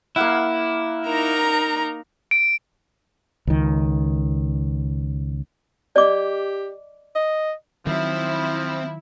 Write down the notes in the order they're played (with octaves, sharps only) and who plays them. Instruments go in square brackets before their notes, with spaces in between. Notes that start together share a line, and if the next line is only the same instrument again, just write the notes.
[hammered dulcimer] A#3 F5 F#5 [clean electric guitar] E4
[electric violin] D#4 A#4 [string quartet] A#5
[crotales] D7
[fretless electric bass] C#2 D#3
[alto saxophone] G4 [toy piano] D5 D#5 D6
[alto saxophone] D#5
[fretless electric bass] D#3 F#3 [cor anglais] F3 [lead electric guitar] C4 [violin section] E4